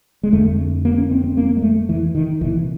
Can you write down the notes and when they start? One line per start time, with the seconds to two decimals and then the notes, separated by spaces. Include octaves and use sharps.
0.23 G#3
0.33 F2 D3 A3
0.85 A#3
0.98 C#4
1.11 C4
1.24 C4
1.37 A#3
1.57 G#3
1.62 A3
1.89 E3
2.15 D#3
2.41 C2 A#2 E3